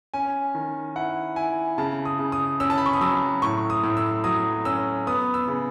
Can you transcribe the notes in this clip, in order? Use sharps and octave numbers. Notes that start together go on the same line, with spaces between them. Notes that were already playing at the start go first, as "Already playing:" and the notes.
C#4 G#5
D#3
E4 F#5
E4 G#5
C#3 A5
D#6
C#3
D#6
C#4 E6
A5
B5
C#6
D#6
F#3 E6
A2 C#6
D#6
A2
E6
F#3 D#6
C#4 E6
B3 D#6
E6
C#3